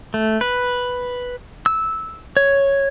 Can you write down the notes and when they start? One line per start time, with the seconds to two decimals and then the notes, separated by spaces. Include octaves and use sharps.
0.14 A3
0.41 B4
1.66 E6
2.37 C#5